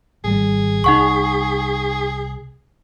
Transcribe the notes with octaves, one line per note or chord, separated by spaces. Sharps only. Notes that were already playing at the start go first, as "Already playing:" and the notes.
G#1 G3 G#4
C2 D#4 F#5 C#6